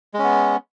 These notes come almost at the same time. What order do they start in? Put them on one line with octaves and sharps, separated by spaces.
G#3 C#4 B3